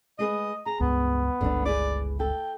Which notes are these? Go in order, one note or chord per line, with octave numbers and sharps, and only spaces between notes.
G#3 G#4 B4 D#5
G#4 A#5
C#2 G2 B3
G1 C#2 G2 D3 D4
E4 G#4 B4 D5
A4 G5